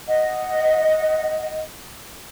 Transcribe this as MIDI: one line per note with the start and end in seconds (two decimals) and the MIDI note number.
0.08 1.59 75
0.08 1.59 78